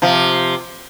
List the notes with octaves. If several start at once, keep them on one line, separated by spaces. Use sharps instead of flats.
C3 F3